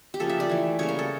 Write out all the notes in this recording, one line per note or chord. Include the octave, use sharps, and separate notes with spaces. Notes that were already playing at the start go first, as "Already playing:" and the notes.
G4
C#3 F3 A#3 A4
E5
D5
E3 A3
C#3 G3 A#3 C#5
A#4
A4